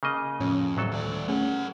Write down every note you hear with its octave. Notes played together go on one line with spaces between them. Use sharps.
C#3 A#3 D#5
F2 A2 C#4
D2 A2 F#3 G3 A4
D#2 D5
A3 C#4 G#4 A#4 F#5